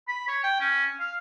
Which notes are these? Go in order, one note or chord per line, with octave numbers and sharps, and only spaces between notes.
B5
C#5
G5
C#4
F5